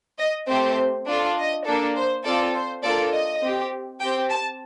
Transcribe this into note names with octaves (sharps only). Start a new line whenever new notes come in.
D#5
A3 C4 G4 C5
D4 F4 A4
D#5
A#3 D4 A4
C5
C4 F4 A4 D5
C5
A#3 D4 F4 A4 D5
D#5
C4 G4
C4 G4 G5
A5